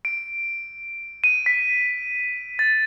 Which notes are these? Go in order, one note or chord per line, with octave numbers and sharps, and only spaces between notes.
D7
D#7
B6
A6